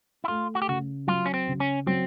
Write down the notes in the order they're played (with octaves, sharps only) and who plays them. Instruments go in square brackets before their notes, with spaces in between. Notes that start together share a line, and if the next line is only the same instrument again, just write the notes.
[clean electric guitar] E4
[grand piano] A3 [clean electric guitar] F4
[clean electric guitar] F#4
G4
[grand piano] C#3 [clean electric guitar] F#4
[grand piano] F#3 [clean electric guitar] F4
[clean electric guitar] C#4
C4
[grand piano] C#3
[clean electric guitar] C#4
[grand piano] F#3 [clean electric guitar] C4